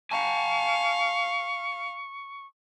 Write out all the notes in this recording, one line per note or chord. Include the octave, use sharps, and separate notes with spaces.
F5 G#5 A5 C#6